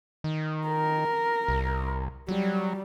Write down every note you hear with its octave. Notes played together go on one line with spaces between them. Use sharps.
D#3
A#4
C2
F#3 G3